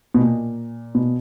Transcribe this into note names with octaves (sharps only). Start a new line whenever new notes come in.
B2
A#2
B2